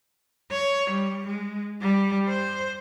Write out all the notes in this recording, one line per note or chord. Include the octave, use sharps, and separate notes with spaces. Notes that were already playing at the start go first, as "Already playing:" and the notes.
C#5
G3
G#3
G3
C5